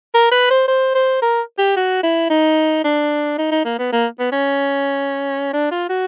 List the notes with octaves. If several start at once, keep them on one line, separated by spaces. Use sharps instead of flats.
A#4
B4
C5
C5
C5
A#4
G4
F#4
E4
D#4
D4
D#4
D#4
A#3
B3
A#3
B3
C#4
D4
F4
F#4